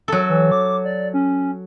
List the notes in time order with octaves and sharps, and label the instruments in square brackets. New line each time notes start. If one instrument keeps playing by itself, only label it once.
[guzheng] F#3 A4
[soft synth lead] E3
D6
D5
C#4